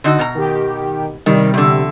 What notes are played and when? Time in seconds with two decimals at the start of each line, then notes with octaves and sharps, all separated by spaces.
0.04 D3 D#4 F#4
0.19 B2 A#5
0.35 D#3 G4
1.26 C3 D#3 G3
1.54 E2 D3